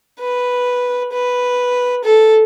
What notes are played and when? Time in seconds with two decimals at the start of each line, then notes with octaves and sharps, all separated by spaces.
0.20 B4
1.12 B4
2.04 A4